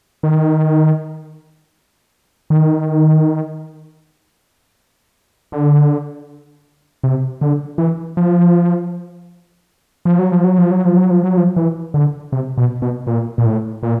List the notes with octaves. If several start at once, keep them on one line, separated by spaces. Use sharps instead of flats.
D#3
D#3
D3
C3
D3
E3
F3
F3
F#3
F3
F#3
F3
F#3
F3
F#3
F3
F#3
F3
E3
D3
C3
B2
B2
A#2
A#2
A2
A#2